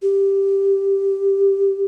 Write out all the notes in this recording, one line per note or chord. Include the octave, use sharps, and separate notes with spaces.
G4